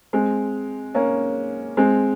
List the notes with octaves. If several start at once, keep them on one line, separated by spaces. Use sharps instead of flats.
G#3 C4
A#3 C#4
G#3 C4